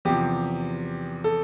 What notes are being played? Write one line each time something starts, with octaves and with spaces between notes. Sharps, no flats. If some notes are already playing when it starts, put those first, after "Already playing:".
E2 C3 F3 G4
A4